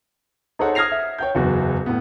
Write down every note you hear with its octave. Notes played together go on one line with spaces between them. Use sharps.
D#4 G#4 A4 C5 C#5 F#5
D#6 F6 G#6 A#6 C7 F7
E5
C#5 G5 G6
F#1 E2 F#4
A2 B3